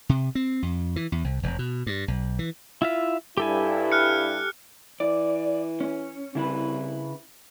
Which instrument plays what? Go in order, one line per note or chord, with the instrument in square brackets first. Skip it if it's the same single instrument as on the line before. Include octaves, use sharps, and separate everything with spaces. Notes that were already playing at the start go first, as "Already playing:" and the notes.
[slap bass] C3
C4
F2
E3
E2
C2
E1
B2
G2
B1
E3
[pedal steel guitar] E4 F4 E5
[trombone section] G2 E4 [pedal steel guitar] G4 A4 G#5
[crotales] F6 F#6 C#7
[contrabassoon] E3 [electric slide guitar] D5
[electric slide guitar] C#4
[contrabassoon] C2 [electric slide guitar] C#3 E4 B4